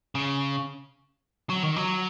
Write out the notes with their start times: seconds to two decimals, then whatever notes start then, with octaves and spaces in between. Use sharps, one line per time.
0.15 C#3
1.50 F#3
1.63 D#3
1.76 F#3